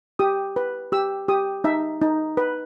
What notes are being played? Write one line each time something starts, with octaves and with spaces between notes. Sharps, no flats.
G4 D#6
B4
G4 E6
G4 D#6
D#4 E5
D#4
B4